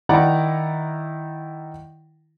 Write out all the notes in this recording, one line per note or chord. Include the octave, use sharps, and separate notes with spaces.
D#3 E4 D5 F#5 A#5